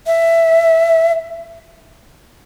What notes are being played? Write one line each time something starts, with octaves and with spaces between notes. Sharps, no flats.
E5